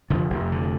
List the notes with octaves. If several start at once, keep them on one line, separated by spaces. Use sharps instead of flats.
F1 D3 F3
F1
D3